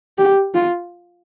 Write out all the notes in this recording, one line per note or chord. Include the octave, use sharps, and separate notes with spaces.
G4
F4